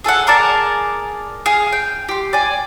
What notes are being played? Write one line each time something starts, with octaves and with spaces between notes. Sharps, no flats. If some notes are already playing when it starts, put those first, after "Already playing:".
G#4 A4 F5 F#5
G#4 A#4 D5 A5
G#4 F5
G5
G4 C6
D5 G#5